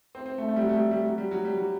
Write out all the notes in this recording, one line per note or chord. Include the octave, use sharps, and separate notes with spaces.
C4
C4
A3
A3
G3
F#3
A3
G3
G3
F#3
G3
F#3
G3
F#3